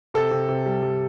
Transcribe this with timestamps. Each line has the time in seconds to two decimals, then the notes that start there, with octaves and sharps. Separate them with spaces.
0.14 C3 A4
0.31 C3
0.49 C3
0.66 G3
0.82 G3